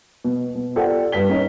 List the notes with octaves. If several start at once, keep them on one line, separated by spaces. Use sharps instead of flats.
B2
B2
F4 G4 A4 C5 D5 F#5
G2 B4 B6 G7
C#4 D#4 C#5